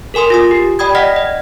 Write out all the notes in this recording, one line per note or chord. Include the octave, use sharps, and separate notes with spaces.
A4 A#4 G#5 C6 D#6
F4 G#5 D#6
G4
D5 G5 B5 D#6 G#6
D5 D#5 F#5 F6 A#6 B6
D#5